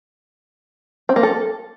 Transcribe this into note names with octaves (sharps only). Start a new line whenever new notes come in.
C4
A#3
A4